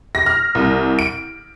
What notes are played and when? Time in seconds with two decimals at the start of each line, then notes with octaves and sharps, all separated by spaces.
0.15 A#6
0.26 F6
0.55 C2
0.99 D7